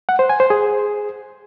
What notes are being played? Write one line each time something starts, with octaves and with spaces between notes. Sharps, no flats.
F#5
C5
G#5
C5
G#4